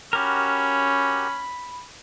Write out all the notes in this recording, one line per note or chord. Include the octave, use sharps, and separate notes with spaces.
C#4 F#4 G4 A#4 B5